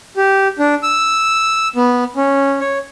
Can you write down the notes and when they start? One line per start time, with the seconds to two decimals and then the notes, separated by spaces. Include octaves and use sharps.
0.17 G4
0.59 D4
0.83 E6
1.76 B3
2.16 C#4
2.60 C#5